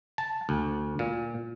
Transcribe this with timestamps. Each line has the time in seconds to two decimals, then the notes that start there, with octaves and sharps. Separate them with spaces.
0.18 A5
0.49 D2
0.99 A#2